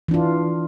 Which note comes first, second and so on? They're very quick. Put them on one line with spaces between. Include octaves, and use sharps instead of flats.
E3 D4 F4